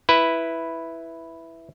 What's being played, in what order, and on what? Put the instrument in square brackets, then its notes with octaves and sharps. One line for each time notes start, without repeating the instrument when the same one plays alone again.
[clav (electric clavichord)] E4 B4